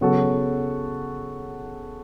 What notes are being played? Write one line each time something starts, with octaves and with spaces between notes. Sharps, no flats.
C#3 F#3 B3 F#4 A4